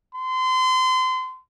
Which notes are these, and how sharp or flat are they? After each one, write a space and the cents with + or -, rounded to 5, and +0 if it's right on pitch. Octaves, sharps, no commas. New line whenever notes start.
C6 -30